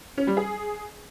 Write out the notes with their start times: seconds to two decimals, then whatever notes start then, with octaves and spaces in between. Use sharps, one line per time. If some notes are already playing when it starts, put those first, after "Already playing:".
0.17 C#4
0.27 G3
0.37 G#4